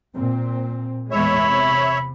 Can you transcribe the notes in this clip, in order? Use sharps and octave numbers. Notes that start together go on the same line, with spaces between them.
A#2 C4
E2 A2 G#3 C#5 E5 B5
C3